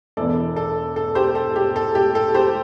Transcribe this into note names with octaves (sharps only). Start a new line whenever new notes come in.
E1 E2 E3 A4 D5
A4
A4
G4 C5
A4
G4
A4
G4
A4
G4 C5